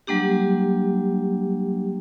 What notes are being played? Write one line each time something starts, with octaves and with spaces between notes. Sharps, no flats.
F#3 G3 A#3 D4 G4